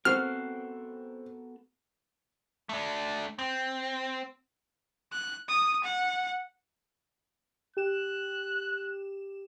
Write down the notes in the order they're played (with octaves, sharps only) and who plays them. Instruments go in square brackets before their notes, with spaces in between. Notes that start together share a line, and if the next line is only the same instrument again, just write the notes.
[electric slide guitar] B3 A4 A#4 [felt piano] C4 [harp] F#4 C7 [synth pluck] F6
[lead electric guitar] A3 D4
C4
[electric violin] F#6
D#6
F#5
[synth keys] G4 E7 [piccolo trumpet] F#6